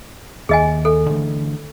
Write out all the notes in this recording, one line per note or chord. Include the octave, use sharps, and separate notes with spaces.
D#2 G#4 D#5 G#5
A4
D3 E3 A3